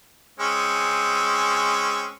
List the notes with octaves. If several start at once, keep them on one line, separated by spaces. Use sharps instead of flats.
G#3 C4 C#4